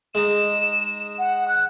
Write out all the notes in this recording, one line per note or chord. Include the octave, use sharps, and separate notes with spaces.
G#3 D#4 E7
F#5
F#6